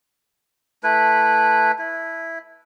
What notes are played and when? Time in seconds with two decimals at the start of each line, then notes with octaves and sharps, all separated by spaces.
0.83 A3 E4 B4
1.79 E4